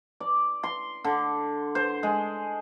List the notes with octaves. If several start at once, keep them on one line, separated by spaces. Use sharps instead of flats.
D5
C6
D3
C5
G#3